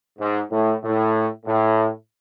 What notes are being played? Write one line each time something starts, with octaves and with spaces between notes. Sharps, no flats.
G#2
A2
A2
A2